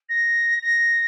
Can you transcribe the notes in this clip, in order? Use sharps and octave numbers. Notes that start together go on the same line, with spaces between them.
A#6
A#6